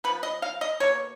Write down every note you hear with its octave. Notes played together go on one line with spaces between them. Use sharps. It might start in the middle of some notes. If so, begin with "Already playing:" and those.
F3 B3 B4
D#5
F5
D#5
B2 A#3 C#5